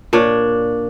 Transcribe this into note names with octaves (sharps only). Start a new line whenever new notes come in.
A#2 D4 C#5